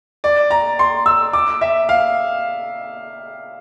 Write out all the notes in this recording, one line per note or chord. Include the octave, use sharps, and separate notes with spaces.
D5
A#5
C6
E6
D6
E5
F5